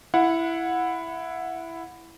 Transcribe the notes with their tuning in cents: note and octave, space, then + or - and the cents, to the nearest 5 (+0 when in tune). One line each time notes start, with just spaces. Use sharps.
E4 +10 F#5 -20